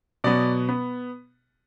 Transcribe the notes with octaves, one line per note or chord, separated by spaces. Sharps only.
B2 F#3 B3 D5
B3